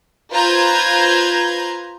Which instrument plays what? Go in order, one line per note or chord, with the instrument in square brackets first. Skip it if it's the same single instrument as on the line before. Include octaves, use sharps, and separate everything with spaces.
[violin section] F4 B4 C5 A#5 G6 G#6